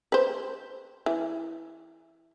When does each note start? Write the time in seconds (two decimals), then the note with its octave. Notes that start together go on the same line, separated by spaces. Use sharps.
0.12 B4 C5
1.06 E3